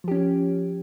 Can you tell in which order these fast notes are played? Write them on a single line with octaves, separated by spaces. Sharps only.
F3 G4 C#4